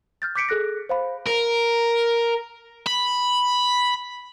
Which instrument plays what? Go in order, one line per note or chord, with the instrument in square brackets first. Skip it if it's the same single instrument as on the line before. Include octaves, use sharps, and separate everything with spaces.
[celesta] F6 G6 A6
D6 G6 B6 C#7 D7
G#4 A4 F#6 A#6
C5 F5 B5
[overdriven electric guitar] A#4
[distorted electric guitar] B5